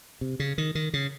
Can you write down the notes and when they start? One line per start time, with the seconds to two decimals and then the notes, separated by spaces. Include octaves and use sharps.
0.21 C3
0.40 C#3
0.58 D#3
0.75 D#3
0.93 C#3